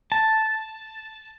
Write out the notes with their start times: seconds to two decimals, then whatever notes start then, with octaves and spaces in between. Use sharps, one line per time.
0.12 A5